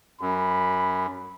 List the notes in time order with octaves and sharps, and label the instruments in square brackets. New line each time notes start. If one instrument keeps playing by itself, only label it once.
[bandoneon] F#2 [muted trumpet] B5